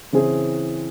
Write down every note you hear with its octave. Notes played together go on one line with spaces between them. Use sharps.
C#3 E3 C4 E4 G#4